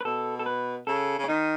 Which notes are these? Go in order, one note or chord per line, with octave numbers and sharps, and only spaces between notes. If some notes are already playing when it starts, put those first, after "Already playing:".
B4
B2 A4
A4
B4
C#3 A4
C#3
C#4
D#3 D#4